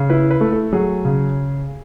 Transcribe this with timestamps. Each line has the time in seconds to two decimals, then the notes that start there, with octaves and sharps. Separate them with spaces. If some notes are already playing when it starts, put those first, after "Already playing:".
Already playing: C#3
0.10 E4 B4
0.31 B4
0.41 A3
0.52 A4
0.73 F#3 G#4
1.05 C#3